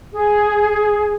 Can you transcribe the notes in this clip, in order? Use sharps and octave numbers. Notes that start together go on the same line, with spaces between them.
G#4